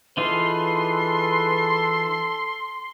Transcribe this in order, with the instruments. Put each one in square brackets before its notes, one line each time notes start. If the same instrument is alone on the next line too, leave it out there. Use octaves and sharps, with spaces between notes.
[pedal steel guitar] E3 D#4 F4 [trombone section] G#4 B4 [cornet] A4 [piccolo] C6